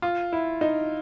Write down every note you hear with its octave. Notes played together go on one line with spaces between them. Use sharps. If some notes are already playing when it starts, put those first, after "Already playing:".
F4
E4
D#4